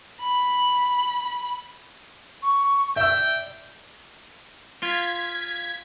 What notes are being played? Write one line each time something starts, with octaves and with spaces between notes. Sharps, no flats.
B5
C#6
D5 E5 G5 E6
F4 G#6 B6